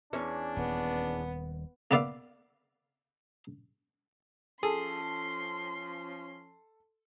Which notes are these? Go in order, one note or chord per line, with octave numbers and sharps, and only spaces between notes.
E2 C#4 D4 G#5
D#1 B3
A#3 B3 B4 D5 E5 F5
F3 C#4 G#4 A4 C6